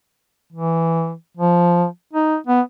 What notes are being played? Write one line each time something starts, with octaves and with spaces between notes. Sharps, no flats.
E3
F3
D#4
B3